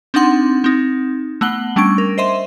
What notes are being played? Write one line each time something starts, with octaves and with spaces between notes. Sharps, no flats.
C4 D4 D#4 F#5 C6
C4 D#4
A3 B3 F#5 F#7 G7
G3 A3 C#4 D4 C#6 D7
A#4
C5 D#5 E5 C6